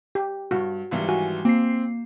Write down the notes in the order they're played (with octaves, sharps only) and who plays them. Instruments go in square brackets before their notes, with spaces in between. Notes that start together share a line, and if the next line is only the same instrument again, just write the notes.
[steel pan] G4
[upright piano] G2 [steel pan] F#4
[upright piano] G#1 E3 G3
[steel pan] F#4 [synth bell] G#5
[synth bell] A#3 C7 [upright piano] C4